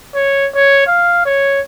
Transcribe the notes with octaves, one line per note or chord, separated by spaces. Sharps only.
C#5
C#5
F5
C#5